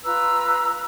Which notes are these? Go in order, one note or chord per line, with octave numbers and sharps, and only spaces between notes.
F4 B4 A#5 E6